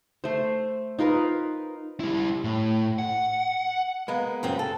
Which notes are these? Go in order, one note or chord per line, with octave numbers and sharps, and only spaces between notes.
A3 C5
D#4 F4 A#4 B4
G3 E4
A2
F#5
G#3 A#3 B3
F#2 C#3 C4
A4